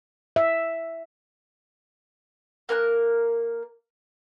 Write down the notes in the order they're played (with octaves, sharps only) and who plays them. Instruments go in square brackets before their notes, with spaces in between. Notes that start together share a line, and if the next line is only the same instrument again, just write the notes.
[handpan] E5
[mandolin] A#3 A#4 G#5 F#6